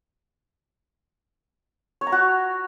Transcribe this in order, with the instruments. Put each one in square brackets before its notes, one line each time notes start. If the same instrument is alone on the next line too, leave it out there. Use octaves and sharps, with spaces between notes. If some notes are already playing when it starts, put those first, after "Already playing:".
[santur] C#5
A#5
F#4